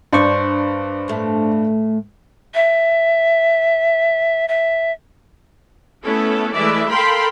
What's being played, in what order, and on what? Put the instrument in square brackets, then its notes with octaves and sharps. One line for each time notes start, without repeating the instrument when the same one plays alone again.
[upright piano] G2 D5 [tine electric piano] D4 C5 C#6
[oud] A2 A3
[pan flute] E5
E5
[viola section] A3 B3 C#4 E4 A4
E3 G#3 A3 E4 D5 E5
A4 A#4 F5 G5 B5 C6